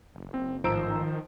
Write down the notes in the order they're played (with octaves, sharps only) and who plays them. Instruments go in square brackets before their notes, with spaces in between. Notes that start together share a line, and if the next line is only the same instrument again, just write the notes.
[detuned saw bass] F#1
[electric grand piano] C4
[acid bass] A1 [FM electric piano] G#2 A#5 E6 [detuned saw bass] D#3 [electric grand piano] F3 C5 D7